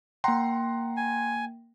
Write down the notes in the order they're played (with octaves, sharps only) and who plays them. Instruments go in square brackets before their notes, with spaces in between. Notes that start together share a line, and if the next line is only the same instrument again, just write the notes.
[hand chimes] A#3 G5 [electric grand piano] F#5 A#5 C6
[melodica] G#5